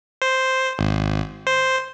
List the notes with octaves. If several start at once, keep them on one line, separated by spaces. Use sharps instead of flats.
C5
G#1
C5